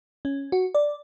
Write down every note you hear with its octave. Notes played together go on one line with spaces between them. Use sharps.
C#4
F#4
D5